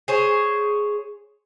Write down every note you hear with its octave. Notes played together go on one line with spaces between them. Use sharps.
G#4 C5 C#5